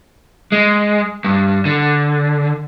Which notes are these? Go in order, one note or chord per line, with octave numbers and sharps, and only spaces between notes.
G#3
G2
D3